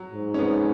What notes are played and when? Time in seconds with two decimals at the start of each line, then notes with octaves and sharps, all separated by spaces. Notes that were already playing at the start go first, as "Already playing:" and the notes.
Already playing: F#3
0.11 G#2
0.34 C#4
0.39 B3